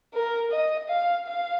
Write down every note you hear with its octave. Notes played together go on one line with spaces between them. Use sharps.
A#4
D#5
F5
F5